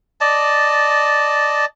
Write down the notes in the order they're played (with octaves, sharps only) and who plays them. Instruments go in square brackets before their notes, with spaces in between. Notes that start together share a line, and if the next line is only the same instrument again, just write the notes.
[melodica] D5 D#5 A5